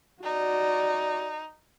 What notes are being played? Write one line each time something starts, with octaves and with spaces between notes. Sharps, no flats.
D#4 F#4 D5